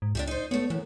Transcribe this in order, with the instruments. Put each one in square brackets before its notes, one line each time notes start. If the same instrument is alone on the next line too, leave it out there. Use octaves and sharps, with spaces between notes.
[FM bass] G#2
[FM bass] C#2 [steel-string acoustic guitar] D4 D#4 G4
[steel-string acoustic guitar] D#4 C5
[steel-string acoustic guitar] A3 C#5 [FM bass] B3
[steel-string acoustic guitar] F#2 [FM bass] E3